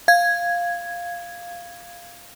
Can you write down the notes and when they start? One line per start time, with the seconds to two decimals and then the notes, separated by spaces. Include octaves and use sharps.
0.08 F5 G#6